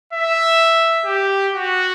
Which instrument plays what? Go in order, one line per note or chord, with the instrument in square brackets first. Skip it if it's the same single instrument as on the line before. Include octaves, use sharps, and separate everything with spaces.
[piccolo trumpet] E5
G4
F#4